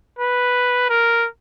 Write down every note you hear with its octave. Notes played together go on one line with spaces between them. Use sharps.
B4
A#4